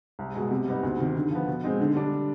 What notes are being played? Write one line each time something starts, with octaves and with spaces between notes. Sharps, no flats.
C2
B2 G#3
C3
G3 B3 D#4
D2
C3 D#3
D3
F3 B3
B2
G#3 C4 D#4
D3
G3 D4